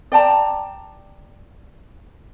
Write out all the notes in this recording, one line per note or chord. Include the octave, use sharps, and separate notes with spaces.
D5 G5 A5 A#5